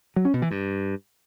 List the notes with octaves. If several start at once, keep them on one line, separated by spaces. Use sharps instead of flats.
F#3
C#4
B2
E3
G2